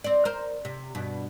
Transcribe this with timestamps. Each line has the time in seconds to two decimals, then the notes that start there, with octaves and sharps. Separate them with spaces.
0.04 C4 D5
0.25 A#4 C5
0.65 C3
0.95 G2 B2